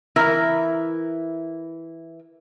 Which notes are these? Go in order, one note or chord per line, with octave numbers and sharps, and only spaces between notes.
E3 E4 A#4 E5